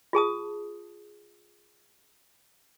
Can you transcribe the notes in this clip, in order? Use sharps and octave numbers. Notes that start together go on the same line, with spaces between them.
F4 G#4 A5 D#6